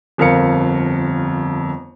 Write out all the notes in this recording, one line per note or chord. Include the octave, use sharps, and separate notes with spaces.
G1 F2 A#4 F5 C#7